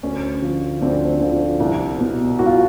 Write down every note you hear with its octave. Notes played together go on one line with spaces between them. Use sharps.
D2 C#4
D3 F3
D2 C4 D4
D3 F3
C2
B2
C2 F#4
F4